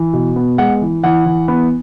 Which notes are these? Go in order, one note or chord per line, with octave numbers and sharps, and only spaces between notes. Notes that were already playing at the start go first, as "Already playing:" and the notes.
Already playing: E3
B2
B3
G#3 F#5
E3
E3 F#5
E3
B3